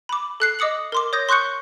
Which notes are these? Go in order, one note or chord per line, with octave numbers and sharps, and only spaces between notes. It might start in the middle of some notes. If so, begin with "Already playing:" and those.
B5 D6
A4 F#6 C7
D#5 D6 D#6 C#7 F#7
A#4 C6 D6
C#5 D#6 G6 A#6
C6 C#6 F#6 G6 C#7